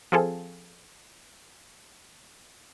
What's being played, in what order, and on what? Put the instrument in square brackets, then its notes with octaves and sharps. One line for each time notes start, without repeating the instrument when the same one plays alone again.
[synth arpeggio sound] F3 C4 F4 G#4 A4